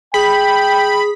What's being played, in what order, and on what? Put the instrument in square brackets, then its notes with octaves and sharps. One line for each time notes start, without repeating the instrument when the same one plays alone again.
[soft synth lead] G#4 [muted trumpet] G5 [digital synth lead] B5